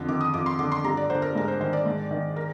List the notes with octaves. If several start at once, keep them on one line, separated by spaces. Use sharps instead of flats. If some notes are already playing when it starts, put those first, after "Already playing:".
Already playing: F2 D3
D#3 D6
D#6
F2 D6
C6
D3 D6
C6
G2 A#5
D5
D3 C5
A#4
G#2 A#4
C5
D#3 C5
D5
G#2
D#3
A#4